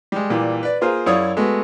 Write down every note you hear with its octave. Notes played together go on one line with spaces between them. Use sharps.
G3 G#3
A#2 E3 G3
B4 D5
A#3 F4 G#4 A#4 C5
F#2 E4 C#5 D5 F5 D#6
G#3 A3 B3 F#4